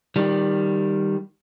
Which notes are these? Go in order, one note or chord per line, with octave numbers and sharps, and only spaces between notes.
D#3 G3